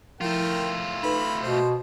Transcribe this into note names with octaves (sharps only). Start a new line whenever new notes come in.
F3 A3 E4 F4 A#4 G5
D#4 A4 B4 B5
B2 C5